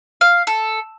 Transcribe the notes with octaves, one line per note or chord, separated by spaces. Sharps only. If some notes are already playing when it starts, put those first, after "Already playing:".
F5
A4